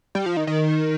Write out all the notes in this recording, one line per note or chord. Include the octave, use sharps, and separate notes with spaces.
G3
F3
D#3
D#3